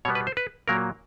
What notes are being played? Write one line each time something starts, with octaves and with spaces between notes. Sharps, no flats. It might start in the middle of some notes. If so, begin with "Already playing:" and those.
B2 G3 B3 C#5
B4
C5
B4
A#2 F#3 A#3 A#4